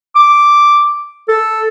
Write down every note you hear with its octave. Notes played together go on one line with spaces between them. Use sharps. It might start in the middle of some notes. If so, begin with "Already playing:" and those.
D6
A4